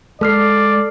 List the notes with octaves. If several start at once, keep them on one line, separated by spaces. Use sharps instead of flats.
G#3 A4 D5 F6 C7